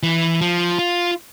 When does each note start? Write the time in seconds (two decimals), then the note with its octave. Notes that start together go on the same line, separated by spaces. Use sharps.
0.03 E3
0.41 F3
0.79 F4